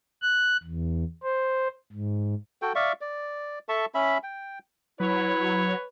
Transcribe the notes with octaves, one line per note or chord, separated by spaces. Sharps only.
F#6
E2
C5
G#2
F#4 A4 G5
D5 E5 F5 C#6
D5
A4 E5 A5 C#6
C#4 E5 B5
G5
F#3 E4 B4 C#5